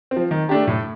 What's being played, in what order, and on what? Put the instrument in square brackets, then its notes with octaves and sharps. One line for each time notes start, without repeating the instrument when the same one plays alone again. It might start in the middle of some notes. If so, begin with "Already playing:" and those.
[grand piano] C4
F3
D#3
A3 D4 G4
A2